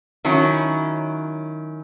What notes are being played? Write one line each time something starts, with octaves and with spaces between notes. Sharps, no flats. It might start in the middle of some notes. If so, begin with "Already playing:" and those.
D#3 F#3 C#4 E4